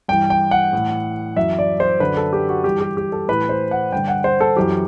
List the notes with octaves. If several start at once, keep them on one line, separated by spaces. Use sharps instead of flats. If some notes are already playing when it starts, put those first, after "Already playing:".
G2 E3 G5
G5
F#5
A2 E3
F#2 E3 E5
D5
C5
F#2 D3 B4
A4
G4
F#4
G2 E3 G4
G4
G4
A4
A2 E3 B4
C5
F#5
G2 D3 G5
F#5
C5
A4
F#2 E3 G4